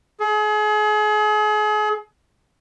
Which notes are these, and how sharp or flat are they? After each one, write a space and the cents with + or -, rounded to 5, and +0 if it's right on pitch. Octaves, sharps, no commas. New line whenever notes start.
G#4 +35